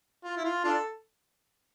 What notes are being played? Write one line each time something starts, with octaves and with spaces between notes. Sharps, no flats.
F4
E4
F4
D4 F4 A4